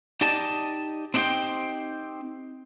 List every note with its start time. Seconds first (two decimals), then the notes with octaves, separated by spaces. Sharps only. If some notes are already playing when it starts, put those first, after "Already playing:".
0.21 D#4 G4 D5 D#5 A5
1.14 C4 D4 D#4 G4 C5 G5